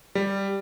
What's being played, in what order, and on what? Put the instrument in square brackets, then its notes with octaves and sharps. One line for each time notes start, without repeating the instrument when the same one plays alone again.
[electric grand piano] G3